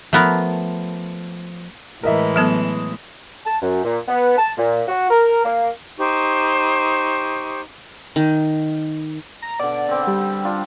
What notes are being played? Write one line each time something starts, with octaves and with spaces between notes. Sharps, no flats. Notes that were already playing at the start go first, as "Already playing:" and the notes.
F3 A3 B3 A#4
A2 E3 G#3 A#4 D#5 E5
F#3 B3 A4 D#6 E7
A5
F#2
A#2
B3
A5
A#2
F#4
A#4
A#3
D#4 G4 C5 C#6
D#3
A#5
B2 D3 D5
D3 C4 B4
G3
D4 F4